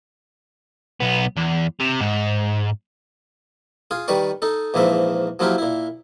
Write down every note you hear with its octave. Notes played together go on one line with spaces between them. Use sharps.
B1 B3
E2
C3
G#2
F4 G#4
D#3 G3 B4 D5 C#6
D#4 A4
A#1 G#2 E3 F3 A#3 E5
F3 F#3 A#3 E4 F4 G4
A#2 E4